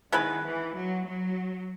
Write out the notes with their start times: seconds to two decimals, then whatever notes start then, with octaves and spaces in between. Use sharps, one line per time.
0.12 D#3 G#3 B3 E4 B4
0.45 E3
0.76 F#3
1.07 F#3